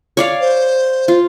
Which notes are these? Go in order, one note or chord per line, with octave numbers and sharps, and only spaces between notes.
C#5 D5 F5
C5
F4